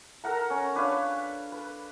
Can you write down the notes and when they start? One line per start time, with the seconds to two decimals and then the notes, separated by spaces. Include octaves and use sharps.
0.24 A4 A#4 F#5 A#5
0.50 C#4
0.75 D4 B4 C#5 F5
1.52 B4